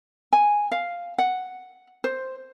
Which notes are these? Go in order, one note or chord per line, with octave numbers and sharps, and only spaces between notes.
G#5
F5
F#5
C5